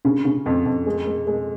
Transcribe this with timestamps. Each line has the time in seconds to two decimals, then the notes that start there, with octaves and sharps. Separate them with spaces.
0.05 C#3
0.25 C#3
0.46 F2
0.66 F2
0.86 G#3
1.07 G#3
1.27 G#3